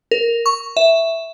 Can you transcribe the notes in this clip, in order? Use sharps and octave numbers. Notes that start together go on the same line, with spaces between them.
A#4
C#6
E5